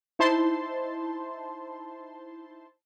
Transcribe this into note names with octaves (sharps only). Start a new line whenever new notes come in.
D#4 E4 C5 A5 C6